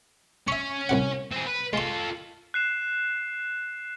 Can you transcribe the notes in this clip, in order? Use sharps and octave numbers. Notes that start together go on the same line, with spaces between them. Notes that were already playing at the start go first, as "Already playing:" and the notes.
C#4 E5 C#6
C2 C3 F#5
C4 G#4
B4
G#3 F4 A4 C6
F#6 C7 E7